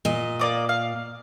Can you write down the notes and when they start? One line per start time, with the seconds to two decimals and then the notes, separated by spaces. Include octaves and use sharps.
0.05 A#2 D#5
0.39 A#3 D5 D#6
0.69 F5